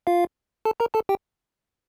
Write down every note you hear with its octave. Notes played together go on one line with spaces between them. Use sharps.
F4 F5
A4 A5
A#4 A#5
A4 A5
G4 G5